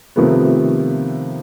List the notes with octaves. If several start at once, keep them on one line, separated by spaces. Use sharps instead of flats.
C3 D#3 F3 A3 B3